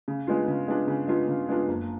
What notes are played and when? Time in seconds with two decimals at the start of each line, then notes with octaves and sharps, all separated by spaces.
0.08 C#3
0.27 G#3 B3 D4 F4
0.48 C#3
0.68 G#3 B3 D4 F4
0.88 C#3
1.08 G#3 B3 D4 F4
1.28 C#3
1.49 G#3 B3 D4 F4
1.68 F#1